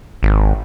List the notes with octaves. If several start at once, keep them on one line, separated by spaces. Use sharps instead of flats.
G#1